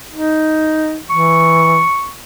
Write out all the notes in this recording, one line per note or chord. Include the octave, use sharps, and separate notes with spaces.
D#4
E3 C#6